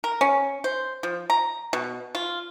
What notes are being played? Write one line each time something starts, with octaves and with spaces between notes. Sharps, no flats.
A#4
C#4
C5
F3
A#5
B2
F4